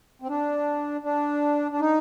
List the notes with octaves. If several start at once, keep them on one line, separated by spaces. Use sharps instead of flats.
C4
D4
D4
D4
D#4